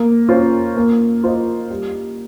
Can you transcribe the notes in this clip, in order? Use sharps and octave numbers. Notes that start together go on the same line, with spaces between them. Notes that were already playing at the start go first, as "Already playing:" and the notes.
Already playing: A#3
C#4 F4 C5
A#3
F4 C5 D#5
G3